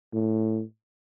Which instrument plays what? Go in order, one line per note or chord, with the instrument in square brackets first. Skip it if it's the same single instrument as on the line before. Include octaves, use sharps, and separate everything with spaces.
[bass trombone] A2